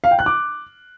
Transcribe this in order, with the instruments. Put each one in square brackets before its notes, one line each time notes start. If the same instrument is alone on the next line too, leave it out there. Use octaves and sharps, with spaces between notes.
[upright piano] F5
G5
F#6
D6